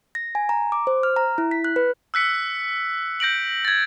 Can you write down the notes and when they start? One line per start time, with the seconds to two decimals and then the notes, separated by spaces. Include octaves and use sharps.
0.15 A#6
0.35 G#5
0.49 A#5
0.72 D6
0.87 C5
1.03 F6
1.16 A#5
1.38 E4
1.51 B6
1.64 F#6
1.76 B4
2.14 E6 F#6 B6 C#7
3.20 G6 A#6 D7 F#7
3.65 G#6 A6